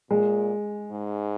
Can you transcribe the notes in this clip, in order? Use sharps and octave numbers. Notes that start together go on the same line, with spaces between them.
A#2 G#3
G#2